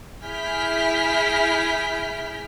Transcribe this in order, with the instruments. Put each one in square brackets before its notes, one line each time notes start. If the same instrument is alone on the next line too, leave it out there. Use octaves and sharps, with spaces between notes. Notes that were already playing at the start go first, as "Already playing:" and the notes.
[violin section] E4 G#4 F6 G6 B6 D7